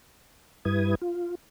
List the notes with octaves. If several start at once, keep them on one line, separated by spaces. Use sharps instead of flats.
G2 G3 E4 B4 D#6 G#6
F4